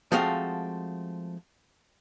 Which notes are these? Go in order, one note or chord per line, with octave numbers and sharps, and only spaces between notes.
F3 G#3 A3 C4 F#4 F5